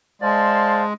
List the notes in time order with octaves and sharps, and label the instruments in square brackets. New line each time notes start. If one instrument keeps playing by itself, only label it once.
[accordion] G#3 [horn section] C5 F5 A5 [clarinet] D5